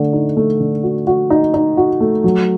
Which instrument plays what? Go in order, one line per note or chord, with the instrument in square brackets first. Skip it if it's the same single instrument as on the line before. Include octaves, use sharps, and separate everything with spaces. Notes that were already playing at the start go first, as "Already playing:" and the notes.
Already playing: [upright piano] D3 A3
D#4
A3
D3
F#4
F#4
D#4
D#4
F#4
A3
F#3